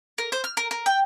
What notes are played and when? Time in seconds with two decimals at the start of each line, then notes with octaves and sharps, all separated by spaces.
0.18 A#4
0.32 C5
0.44 F6
0.57 A#4
0.71 A#4
0.86 G5